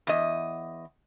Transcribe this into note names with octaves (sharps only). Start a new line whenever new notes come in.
E2 D#5